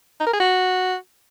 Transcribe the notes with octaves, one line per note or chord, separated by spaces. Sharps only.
D#4
A#4
G#4
F#4